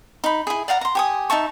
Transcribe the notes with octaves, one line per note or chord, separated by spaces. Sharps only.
D#4 B5
E4 G#4
D5 F5 F#5 A#5
A#5 C6
G4 G#5 D#6
D#4 E5 A5 C#6